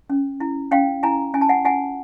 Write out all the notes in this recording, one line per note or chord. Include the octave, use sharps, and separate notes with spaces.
C#4
E4
C#4 F5 G5
E4 G#5 A#5
C#4 G#5
A5
F#5 G#5
F4 F#5 G#5